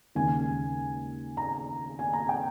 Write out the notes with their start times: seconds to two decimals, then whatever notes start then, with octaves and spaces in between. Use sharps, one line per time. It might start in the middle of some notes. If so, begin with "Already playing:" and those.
0.15 D#2 C#3 G#3 G#5
1.37 A#5
1.99 G#5
2.13 A#5
2.29 G5